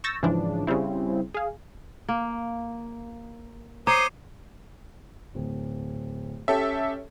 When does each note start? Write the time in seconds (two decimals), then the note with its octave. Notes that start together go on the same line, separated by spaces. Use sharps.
0.04 C#6 E6 G6 A6 A#6
0.23 G#2 C#3 E3 F3 D4
0.67 C#3 G3 C4 E4
1.34 G#4 F5
2.09 A#3
3.87 C5 C#5 A#5 C6 D6 D#6 C7 D#7
5.35 D1
6.48 C#4 G4 A4 E5